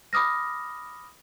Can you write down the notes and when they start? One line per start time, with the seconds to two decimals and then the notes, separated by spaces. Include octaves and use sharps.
0.13 B5 D6 D#6 F6 A#6